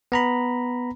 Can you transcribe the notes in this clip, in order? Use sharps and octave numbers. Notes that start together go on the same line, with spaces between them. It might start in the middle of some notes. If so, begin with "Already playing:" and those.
B3 A#5 B5